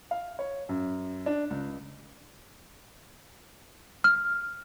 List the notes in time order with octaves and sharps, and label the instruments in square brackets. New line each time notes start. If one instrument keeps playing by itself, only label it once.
[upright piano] F5
C#5
F#2
D4
C#2
[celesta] F6